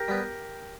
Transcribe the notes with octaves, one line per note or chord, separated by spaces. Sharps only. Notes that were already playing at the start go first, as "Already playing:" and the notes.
Already playing: G4 A#4
G3 B3